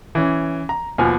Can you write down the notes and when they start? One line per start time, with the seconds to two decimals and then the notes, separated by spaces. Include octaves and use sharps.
0.15 E3 C#4
0.69 A#5
0.98 D#2 B2 F3 B3 G#5 F6